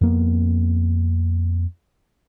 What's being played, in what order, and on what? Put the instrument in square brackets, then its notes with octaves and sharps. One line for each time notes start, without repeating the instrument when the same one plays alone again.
[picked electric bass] F2 A#3 B3